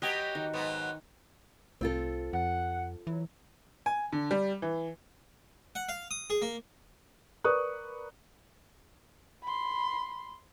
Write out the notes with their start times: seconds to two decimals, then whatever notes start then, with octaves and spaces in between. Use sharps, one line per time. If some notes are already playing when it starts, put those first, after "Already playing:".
0.02 F#3 G4 B4 D#5 G#5 C#6
0.35 D#3
0.53 G#2 F#3 B3
1.81 C2 C4 F4 A4
2.33 F2 F#5
3.07 E3 F#3
3.86 G#5
4.12 D3
4.31 G3
4.62 E3
5.75 F#5
5.89 F5
6.11 D#6
6.30 G#4
6.42 A#3
7.44 A#4 B4 D5 C#6 D#6 F#6
9.43 B5 C6